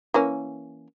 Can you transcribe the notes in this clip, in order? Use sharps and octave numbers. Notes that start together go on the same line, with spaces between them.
E3 A#3 C#4